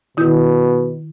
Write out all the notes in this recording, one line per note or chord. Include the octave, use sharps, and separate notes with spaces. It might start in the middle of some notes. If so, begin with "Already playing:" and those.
B2 D#3 E4 G6